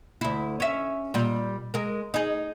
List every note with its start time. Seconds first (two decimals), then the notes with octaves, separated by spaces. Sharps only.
0.21 D2 E4
0.60 C#4 E5
1.14 A#2 G3
1.74 G#3 A#4
2.14 D#4 G#4